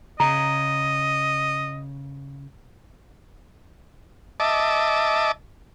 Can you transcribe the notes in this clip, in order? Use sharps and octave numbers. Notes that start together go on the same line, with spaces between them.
C#3 D#5 A#5
D#5 E5 A5 D6